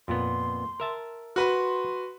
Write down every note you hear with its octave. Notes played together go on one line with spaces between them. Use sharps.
F2 A#2 B3 C6
A#4 E5 A5
F#4 B4 B5 C6